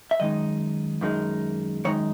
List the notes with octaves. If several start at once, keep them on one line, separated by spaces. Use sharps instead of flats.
E5
F#2 D#3 G#3 D#4 D#5
F#2 D#3 G#3 D#4
F#2 D#3 G#3 D#4 C#5